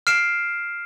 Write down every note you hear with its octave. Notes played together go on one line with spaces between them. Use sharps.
F6 C7 D7 E7